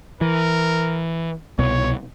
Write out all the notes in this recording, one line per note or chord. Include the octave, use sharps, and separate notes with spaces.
E3 A#4
C2 B2 C#5